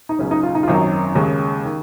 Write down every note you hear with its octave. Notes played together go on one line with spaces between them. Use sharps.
D#4
C#2 C#3 F#3 C#4
D#4
F4
D#4
F4
G#1 F#2 D#3 F#3 D#4
D#2 C#3 G#3
D#3